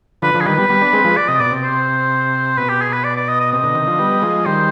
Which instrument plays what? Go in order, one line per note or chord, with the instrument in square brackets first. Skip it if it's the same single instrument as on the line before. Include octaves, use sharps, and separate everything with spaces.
[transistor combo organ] D3 F3 [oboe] B4
[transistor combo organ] D3 F3
[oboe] G#4
[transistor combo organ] D#3 G3 [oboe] B4
[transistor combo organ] G3 B3
G3 B3
B3 D4
G#3 C4
F3 G#3
[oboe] D5
[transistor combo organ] C3 [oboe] D#5
[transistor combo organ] B2 [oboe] D5
[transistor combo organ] C3
[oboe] C5
[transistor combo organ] B2 [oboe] B4
[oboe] G4
G#4
B4
D5
D5
D#5
D#5
[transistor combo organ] C3 [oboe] D#5
[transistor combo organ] B2 D3
C3 D#3
D3 F3
G3 B3
F3 G#3
[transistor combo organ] D#3 G3 [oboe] C5